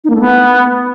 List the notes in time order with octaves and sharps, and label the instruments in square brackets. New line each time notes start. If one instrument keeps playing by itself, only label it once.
[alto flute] D#4
A#3
A3
B3